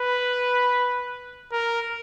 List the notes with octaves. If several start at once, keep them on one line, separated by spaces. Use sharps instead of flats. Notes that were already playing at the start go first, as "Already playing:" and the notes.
Already playing: B4
A#4